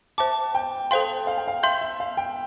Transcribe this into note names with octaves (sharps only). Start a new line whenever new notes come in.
C5 E5 G5 A5 D6
G5
A4 C5 F5 G5 C6
F5
G5
F5
E5 F5 C6 G6
E5
F5
G5